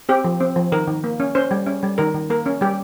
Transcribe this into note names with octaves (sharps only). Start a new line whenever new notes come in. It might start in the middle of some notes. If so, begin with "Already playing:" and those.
C4 G4
F3
C4
F3
D#3 A#4
D#3
A#3
C#4
C#4 C5
G3
C#4
G3
D#3 A#4
D#3
A#3 A#4
C#4
G3 G4